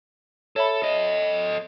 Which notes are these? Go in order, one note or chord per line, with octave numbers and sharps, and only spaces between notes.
A4 C#5 E5 B5
A4 D#5